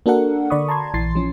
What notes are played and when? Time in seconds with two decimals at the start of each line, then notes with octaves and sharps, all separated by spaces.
0.06 A#3 D4 F#4 A4 A#4 F#5
0.50 D3 D5 B5 C#6 D#6
0.68 A5 A#5 C6 G#6
0.94 A#1 E3 C6 A6 C7
1.15 F3 C#4